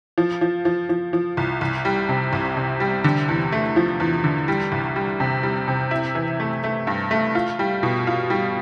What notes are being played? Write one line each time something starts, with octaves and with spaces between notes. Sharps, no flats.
F3
F3
F3
F3
F3
C2
C2
G3
C3
C2
C3
G3
D3
E2
A3
F3
E2
D3
G3
C2
G3
C3
G3
C3
E4
E3
A3
A3
G2
A3
F4
G3
B2
F4
G3